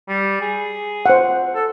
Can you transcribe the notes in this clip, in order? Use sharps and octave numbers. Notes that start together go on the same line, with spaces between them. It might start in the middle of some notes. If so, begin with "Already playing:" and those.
G3
G#4
C5 F#5
A4